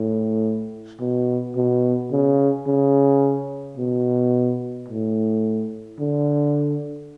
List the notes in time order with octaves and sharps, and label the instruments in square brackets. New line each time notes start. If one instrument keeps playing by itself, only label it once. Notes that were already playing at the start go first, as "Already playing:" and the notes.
Already playing: [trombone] A2
B2
B2
C#3
C#3
B2
A2
D3